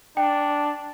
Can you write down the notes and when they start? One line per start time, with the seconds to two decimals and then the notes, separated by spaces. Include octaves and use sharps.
0.17 D4 G5